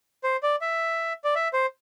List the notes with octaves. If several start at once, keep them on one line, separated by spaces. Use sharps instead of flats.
C5
D5
E5
D5
E5
C5